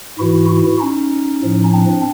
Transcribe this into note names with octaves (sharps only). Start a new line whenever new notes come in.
G#2 E3 E4 F#4
E4 F#4
C#4 D#4
A2 F3
C4 D4